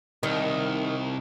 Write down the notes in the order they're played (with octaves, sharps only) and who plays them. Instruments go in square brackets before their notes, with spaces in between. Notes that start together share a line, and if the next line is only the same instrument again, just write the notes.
[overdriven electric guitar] C2 [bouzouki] D#3